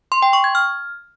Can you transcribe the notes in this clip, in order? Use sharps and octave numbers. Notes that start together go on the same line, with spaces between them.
C6
G5
C#6
G#6
F6